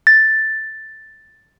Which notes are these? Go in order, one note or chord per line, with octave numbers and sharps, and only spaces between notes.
A6